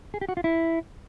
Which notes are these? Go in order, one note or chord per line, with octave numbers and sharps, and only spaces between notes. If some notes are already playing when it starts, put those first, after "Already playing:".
G#4
G4
F#4
F4
E4